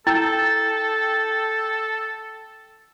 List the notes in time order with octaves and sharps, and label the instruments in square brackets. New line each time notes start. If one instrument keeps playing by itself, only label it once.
[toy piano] E4 [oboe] A4 [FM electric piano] G5 E6 G6